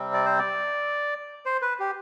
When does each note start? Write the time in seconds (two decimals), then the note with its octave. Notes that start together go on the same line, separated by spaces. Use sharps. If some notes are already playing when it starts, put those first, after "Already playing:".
Already playing: C3 G3 C4
0.13 D5
0.26 C5
0.39 D5
1.46 C5
1.62 B4
1.80 G4